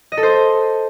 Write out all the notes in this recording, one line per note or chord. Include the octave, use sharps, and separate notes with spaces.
D#5
A4
C5